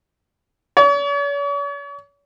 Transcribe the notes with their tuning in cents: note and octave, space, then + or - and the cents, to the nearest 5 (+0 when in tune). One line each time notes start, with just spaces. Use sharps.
C#5 +45